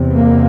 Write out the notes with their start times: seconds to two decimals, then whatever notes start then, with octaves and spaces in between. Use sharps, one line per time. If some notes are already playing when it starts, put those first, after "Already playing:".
Already playing: E2 C3
0.14 A#3